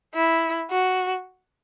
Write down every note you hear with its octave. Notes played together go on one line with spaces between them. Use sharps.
E4
F#4